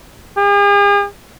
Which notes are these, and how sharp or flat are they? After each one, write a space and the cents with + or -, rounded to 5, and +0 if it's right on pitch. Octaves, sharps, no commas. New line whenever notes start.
G#4 -45